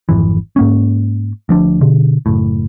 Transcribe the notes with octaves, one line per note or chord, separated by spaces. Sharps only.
G#1 F2 E3
G#2 A#3 C#4
D2 F3 D4
B2 D3
F#1 A2